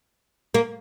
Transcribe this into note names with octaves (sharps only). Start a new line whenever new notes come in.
A#3